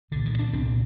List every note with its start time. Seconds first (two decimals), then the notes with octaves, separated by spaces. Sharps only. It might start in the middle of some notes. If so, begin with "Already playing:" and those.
0.11 C2 A#2 D3
0.26 D#3
0.39 D4
0.53 C2 A#2 C4